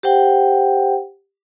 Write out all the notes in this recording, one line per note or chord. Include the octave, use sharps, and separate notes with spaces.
G4 C5 F#5 G5